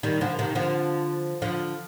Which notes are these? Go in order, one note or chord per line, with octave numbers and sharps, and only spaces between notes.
D#3 G3
D3 F3
C3 D#3
D3 F3
D3 F3